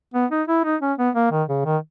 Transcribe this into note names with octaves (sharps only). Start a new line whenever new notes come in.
B3
D#4
E4
D#4
C#4
B3
A#3
D#3
C#3
D#3